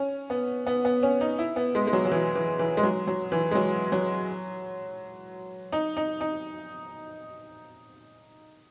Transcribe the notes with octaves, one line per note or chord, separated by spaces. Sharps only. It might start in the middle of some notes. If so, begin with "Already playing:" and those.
Already playing: C#4
B3
B3
B3
C#4
D#4
E4
B3
G#3
G#3
F#3
F#3
E3
E3
E3
G#3
F#3
F#3
E3
G#3
F#3
F#3
D#4
D#4
D#4